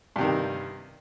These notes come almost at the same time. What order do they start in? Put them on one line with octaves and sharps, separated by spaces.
G2 C3 D#3